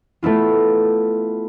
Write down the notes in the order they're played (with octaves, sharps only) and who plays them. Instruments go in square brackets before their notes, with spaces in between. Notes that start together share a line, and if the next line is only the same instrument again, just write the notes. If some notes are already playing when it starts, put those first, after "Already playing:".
[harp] A3 B3 E4 F4